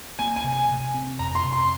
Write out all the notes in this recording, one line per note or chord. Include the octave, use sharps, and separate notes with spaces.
A#3 G#5
G#5
C3
G#5
C3
C4
F2 A#5
C6
C3
C6